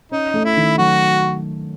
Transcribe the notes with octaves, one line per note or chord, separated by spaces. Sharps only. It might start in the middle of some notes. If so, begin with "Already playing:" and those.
C#4 D#4
A3
E4
D#3
F#3 F#4